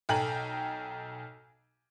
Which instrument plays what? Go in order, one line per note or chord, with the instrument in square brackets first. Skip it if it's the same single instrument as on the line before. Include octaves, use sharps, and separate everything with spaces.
[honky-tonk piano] B1 A4 G5 G#5 A#5 F#7